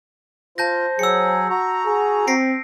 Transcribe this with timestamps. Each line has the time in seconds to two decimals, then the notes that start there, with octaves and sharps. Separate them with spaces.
0.58 F4 C5 A5 G6 A#6
0.99 F#3 G#4 E6 C#7
1.50 F#4 A#5
1.86 G#4
2.27 C4 A#6 C7 D7